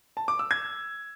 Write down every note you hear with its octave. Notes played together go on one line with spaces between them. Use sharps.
A5
D6
E6
G#6